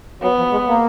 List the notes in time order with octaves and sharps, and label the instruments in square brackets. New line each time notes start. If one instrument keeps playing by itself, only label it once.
[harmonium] F#3 [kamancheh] B3
[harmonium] F3
G#3
A#3